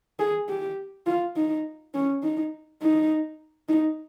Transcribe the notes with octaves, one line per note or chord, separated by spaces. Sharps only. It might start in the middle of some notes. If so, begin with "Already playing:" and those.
G#4
G4
F4
D#4
C#4
D#4
D#4
D#4